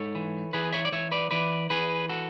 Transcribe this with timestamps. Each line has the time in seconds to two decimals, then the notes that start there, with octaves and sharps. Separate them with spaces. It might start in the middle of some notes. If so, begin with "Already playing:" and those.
Already playing: G#2 A4 C#5
0.15 E3
0.53 E3 G#4 B4
0.73 C#5 E5
0.85 D5
0.92 E3 C#5 E5
1.11 B4 D5
1.31 E3 B4 D5
1.70 E3 G#4 B4
2.09 F#4 A4